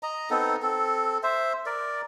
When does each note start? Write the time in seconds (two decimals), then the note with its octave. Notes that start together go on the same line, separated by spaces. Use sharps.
0.03 D#5 A#5
0.30 B3 C4 D#4 A4
0.62 C4 A4
1.23 C5 E5
1.66 A#4 D5